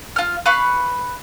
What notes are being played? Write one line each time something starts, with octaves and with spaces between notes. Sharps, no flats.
F4 F6
B4 F5 B5 C#6